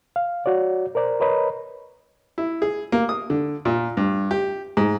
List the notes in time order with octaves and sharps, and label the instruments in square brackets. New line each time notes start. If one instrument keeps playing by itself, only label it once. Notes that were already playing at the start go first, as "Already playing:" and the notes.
[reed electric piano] F5
F#4 C#5 D5
A#4 C5 D5 A#5
A#4 B4 C#5 D#5 A#5 B5
[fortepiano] E4
G#4
A#3
D#6
D3
A#2
G2
G4
G#2